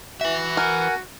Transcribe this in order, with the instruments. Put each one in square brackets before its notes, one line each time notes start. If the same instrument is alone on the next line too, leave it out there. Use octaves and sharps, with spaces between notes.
[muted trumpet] F#4 [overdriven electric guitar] B4 E5
[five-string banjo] A#4 [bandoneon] F#5 G#5